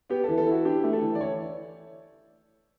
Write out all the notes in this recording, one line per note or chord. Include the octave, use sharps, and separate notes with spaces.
B3 G4
E3 A4
A4
E4 F#4
D4 G4
A3
A4
E3
D5
E3 C#5